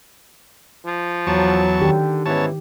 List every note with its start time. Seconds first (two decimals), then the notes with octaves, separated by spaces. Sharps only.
0.86 F3
1.27 E2 F#3 A5 C#6
1.81 D3 D#3 G4
2.26 G#2 E3 B3 C#4 C#5 A5